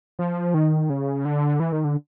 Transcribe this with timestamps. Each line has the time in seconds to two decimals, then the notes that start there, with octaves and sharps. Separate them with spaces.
0.19 F3
0.54 D#3
0.90 C#3
1.25 D3
1.60 E3
1.72 D#3
1.84 D3